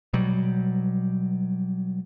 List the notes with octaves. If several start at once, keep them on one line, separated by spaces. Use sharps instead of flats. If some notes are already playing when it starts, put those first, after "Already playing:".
B2 F#3 G3